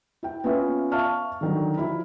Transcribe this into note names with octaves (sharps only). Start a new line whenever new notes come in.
E4 G5
B3 C#4 F4 E5
E5 F5 A5 C#6 F6
D3 D#3 F#3
F3 E4 B5